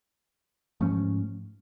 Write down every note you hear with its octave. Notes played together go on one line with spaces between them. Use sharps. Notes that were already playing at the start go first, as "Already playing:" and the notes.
G#2 F3 A3 C#4